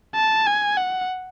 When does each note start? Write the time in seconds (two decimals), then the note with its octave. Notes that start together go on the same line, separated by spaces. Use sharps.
0.15 A5
0.47 G#5
0.77 F#5